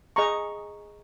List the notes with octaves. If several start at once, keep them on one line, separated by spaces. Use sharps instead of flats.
G#4 D#5 A#5 C#6